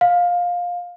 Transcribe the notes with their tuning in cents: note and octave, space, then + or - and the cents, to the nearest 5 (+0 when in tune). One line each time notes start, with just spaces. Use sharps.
F5 +15